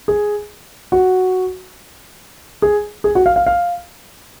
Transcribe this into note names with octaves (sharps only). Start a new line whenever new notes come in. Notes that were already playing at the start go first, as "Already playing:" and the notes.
G#4
F#4
G#4
G#4
F#4
F5
F5
F5